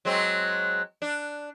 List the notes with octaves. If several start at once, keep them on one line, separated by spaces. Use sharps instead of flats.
F#3 G#3 C4
D4